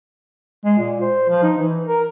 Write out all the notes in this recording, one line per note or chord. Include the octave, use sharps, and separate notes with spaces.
G#3
A#2
C5
F3
D#4
E3
A#4